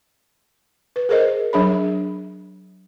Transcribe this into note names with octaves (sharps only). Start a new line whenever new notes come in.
B4
G#4 A#4 C5 D#5
F#3 D4 G#4 C#5 B5